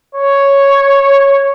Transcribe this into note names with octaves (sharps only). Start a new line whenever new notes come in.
C#5